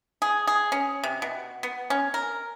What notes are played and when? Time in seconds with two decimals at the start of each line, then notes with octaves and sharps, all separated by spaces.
0.22 G#4
0.47 G#4
0.72 C#4
1.04 C3
1.22 B2
1.63 B3
1.90 C#4
2.14 A#4